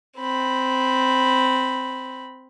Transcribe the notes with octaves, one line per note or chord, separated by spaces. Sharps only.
C4 B5